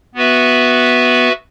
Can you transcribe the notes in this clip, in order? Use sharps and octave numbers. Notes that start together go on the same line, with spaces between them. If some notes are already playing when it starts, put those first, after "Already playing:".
B3 F#4 B4 E5